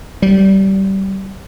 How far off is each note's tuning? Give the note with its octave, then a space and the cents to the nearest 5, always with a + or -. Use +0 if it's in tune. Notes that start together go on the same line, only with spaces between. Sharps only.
G3 -20